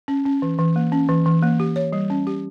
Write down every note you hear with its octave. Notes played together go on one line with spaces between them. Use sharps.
C#4
C#4
E3
E3
A#3
C#4
E3
E3
A#3
G4
C#5
G3
C#4
G4